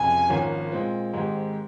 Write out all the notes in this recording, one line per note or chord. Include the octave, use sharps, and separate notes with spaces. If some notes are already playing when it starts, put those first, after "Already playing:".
Already playing: F1 F2 C#3 G#5
G#1 G#2 F3 A#3 C#4
A#2 G#3 C4 F4
G#2 D#3 G#3 C4 G4